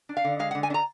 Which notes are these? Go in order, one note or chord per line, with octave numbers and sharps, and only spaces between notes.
D4
F5
D3
G#3 F5
F#5
D3
G#5
D4
A#5